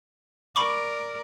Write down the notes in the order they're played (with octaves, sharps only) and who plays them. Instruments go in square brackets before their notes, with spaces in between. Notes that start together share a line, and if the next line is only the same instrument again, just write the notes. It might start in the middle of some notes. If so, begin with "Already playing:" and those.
[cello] A#4 D5 [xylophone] B5 C#6 D6